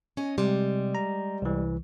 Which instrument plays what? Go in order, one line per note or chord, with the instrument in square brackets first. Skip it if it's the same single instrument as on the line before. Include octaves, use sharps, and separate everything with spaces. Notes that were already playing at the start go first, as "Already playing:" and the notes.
[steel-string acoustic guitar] C#4 D#5
[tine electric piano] C3 [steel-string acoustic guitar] G3 G#3
[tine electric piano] A#5
C2 E3